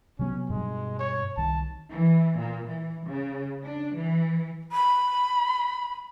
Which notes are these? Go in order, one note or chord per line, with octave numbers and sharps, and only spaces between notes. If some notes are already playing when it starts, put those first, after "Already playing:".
C3 F#3 B3 C#4
G2 B2 G#3
C#5
C2 D#3 A5
E3
A#2
E3
C#3
D4
E3
B5